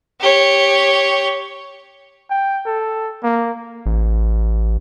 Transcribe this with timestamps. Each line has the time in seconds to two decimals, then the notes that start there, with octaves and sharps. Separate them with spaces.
0.20 G4 C#5
2.30 G5
2.66 A4
3.23 A#3
3.86 A1